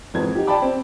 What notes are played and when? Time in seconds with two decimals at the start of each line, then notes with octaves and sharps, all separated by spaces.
0.14 G#1 F2 E3 G#6
0.35 D#4 F#4 G4
0.47 D5 G5 A5 B5 D6
0.62 C4